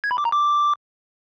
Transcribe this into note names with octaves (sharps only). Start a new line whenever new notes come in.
G#6
B5
D6
A#5
D6